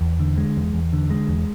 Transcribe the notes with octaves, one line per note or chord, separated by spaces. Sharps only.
E2
D3
G#3
E2
E2
D3
G#3
E2